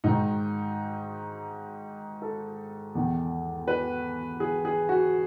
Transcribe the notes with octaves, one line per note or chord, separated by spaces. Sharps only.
G#2 D#3 D#4
A4
E2 D#3
B4
G#4
G#4
F#4